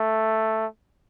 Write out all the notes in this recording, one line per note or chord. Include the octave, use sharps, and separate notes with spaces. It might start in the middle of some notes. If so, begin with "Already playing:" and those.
Already playing: A3